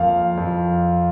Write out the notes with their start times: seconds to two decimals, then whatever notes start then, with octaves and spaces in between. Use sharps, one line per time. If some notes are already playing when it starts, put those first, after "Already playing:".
Already playing: F2 A#3 F5
0.37 F2